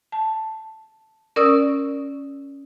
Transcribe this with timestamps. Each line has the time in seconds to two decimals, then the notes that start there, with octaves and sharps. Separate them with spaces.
0.12 A5
1.36 C#4 A#4 D5 C#6 D#6 E6